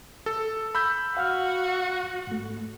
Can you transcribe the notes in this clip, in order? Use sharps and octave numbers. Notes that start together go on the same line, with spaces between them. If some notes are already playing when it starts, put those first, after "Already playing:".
A4
B5 E6 G6
F#4 F5 F#5 F6
G#2 A3